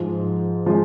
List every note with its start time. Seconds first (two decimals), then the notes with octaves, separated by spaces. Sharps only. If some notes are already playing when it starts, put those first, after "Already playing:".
Already playing: G#2 F3 G#3
0.66 F3 G#3